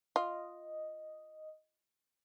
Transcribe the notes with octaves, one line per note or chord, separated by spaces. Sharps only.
F4 D#5